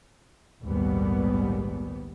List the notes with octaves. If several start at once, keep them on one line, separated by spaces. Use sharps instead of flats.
A#1 D#2 G#2 G3 B3